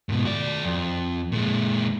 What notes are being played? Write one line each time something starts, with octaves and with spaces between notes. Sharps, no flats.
G#2 B2
F#4 D5
F2
A#2 G#3